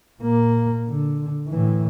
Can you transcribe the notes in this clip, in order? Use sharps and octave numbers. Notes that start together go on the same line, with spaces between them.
A#2 A#3
D3
A2 E3